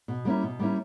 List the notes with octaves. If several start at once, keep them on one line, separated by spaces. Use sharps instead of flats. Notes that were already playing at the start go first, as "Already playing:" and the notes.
B2
G3 A#3 C#4 E4
B2
G3 A#3 C#4 E4